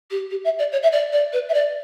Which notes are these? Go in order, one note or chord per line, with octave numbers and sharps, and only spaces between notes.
G4
G4
E5
D5
C#5
E5
D5
D5
B4
E5
D5